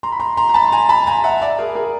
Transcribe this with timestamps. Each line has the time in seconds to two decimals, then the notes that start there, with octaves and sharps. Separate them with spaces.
0.03 A#5 C6
0.12 B5
0.20 A#5 C6
0.37 A#5 C6
0.49 A#5
0.54 A5 B5
0.72 G#5 A#5
0.89 A5 B5
1.07 G#5 A#5
1.24 E5 F#5
1.42 D5 E5
1.58 G#4 A#4
1.75 G#4 A#4